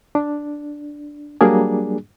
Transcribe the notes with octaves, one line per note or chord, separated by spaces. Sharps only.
D4
F#3 G3 A#3 D4 G#4